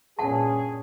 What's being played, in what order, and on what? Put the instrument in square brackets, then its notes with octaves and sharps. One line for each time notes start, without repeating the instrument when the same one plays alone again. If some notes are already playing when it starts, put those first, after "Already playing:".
[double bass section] G2 A#2 C#4 [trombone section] G#4 [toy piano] F#5 A5